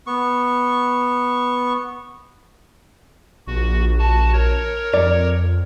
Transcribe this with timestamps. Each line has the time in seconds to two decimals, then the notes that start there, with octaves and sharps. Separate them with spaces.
0.07 B3 C#6
3.47 A#1 F#4
3.99 F#4 A5
4.33 A#4 C#5
4.93 F2 D5